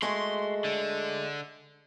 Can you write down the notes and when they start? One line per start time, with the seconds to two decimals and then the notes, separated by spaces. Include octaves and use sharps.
0.02 G#3 A3 F#4 C6
0.64 D3